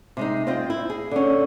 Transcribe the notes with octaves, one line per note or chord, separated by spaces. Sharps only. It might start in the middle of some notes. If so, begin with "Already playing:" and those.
C3 G#3 D#4
C4 F4 D#5 G5
E4
G#4
D3 C#4